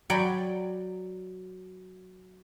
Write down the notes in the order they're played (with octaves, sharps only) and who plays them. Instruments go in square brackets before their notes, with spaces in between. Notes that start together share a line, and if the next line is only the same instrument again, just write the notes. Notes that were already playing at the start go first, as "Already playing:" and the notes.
[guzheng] F#3 D5 G5 B5